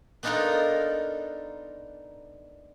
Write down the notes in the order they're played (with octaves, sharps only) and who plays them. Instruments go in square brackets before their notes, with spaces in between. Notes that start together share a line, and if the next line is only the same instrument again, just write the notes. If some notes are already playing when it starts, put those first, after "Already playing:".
[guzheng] B3 D4 D#4 F4 A4 A#4